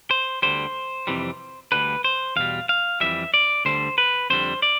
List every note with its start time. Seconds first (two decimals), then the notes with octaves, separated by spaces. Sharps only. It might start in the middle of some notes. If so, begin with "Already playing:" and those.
0.11 C5
0.42 D2 D3 G3 C5
1.07 F2 C3 E3 G3
1.72 D2 D3 G3 B4
2.04 C5
2.36 E2 B2 G3 F5
2.69 F5
3.00 F2 E3 G3 E5
3.34 D5
3.65 D2 D3 G3 C5
3.98 B4
4.30 F2 D3 G3 C5
4.62 D5